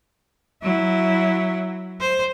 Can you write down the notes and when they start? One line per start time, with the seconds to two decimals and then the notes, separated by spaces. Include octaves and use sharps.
0.62 F#3 E4
2.00 C5